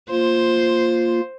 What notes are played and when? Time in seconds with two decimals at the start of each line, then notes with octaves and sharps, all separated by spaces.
0.10 A#3 F4 C5